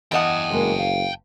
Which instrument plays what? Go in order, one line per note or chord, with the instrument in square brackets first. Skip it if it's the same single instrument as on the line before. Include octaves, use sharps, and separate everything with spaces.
[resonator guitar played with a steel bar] E2 D#5 F#5 [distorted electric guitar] G5 A5
[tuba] F#1 [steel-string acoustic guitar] G2 G#3 A#3
[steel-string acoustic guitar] F5